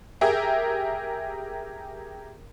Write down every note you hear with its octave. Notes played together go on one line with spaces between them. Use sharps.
G4 G#4 A#4 E5